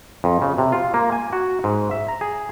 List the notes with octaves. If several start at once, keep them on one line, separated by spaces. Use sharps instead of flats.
F2
C#3
C3
F4
A#3
G#5
F#4
G#2
E5
A#5
G#4